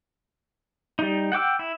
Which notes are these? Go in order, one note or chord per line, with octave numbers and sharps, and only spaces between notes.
G3 D#4
F#5 G5 D6 E6
E4